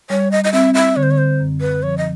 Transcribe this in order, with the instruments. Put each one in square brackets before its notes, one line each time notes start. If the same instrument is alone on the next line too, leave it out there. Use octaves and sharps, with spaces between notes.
[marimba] G3 [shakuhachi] C#5
[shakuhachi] D#5
D#5
[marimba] C4 [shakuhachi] E5
[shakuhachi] E5
[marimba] D3 [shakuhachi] C#5
[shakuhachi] C5
C#5
C5
[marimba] F#2
[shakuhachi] B4
[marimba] F3 [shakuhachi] C#5
[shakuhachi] D#5